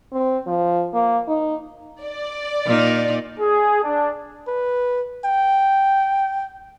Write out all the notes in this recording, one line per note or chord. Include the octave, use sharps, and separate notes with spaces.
C4
F3
A#3
D#4
D5
A#2 D#4
G#4
D4
B4
G5